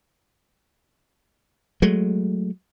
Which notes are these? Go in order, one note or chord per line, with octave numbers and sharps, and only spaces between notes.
F#3 G#3 A3